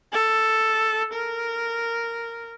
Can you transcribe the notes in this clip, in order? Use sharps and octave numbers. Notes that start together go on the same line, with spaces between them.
A4
A#4